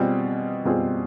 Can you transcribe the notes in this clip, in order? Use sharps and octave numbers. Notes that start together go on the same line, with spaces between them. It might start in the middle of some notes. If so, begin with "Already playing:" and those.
Already playing: B2 G3 C4 F4 G#4
B2 G3 C4 F4 G#4